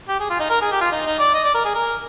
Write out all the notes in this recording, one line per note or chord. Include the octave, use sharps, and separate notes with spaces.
G4
G#4
F4
D#4
A#4
G#4
G4
F4
D#4
D#4
D5
D#5
D5
A#4
G#4
A#4